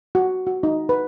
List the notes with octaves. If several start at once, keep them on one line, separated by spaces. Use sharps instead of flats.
F#4
F#4
D#4
B4